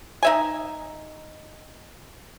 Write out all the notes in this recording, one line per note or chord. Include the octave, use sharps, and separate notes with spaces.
D#4 E5 G#5